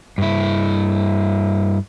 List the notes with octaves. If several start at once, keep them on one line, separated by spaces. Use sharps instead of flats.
G2 E4